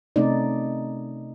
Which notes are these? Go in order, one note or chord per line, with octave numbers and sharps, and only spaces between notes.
C3 A3 C4 C#4 D#4 D5